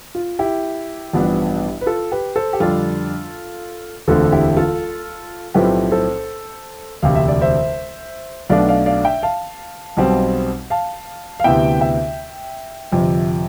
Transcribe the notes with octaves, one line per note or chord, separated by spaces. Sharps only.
F4
E4 G4
A1 G2 F3 B3 D4
B4
F4 A4
G4 B4
A4 C5
G4
F2 D3 G3 D4 F4 A4
E1 D2 D3 A3 C4 F4 A4
E4 G4
F4 A4
B1 A2 F3 A3 C4 G4 B4
A4 C5
E1 D2 C3 F5
E5
D5
C5 E5
B1 B2 A3 D4 D5 F5
D5 F5
D5 F5
E5 G5
F5 A5
B1 B2 G3 C4
F5 A5
F5
D2 C3 E3 B3 E5 G5
E5 G5
G1 F2 C3 F3